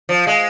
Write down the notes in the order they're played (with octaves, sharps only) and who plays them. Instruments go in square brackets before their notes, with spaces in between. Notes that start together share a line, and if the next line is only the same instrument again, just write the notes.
[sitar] F3
G#3